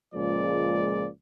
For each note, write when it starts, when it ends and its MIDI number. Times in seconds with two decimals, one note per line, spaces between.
0.15 1.08 37
0.15 1.08 46
0.15 1.08 49
0.15 1.08 53
0.15 1.08 56
0.15 1.08 74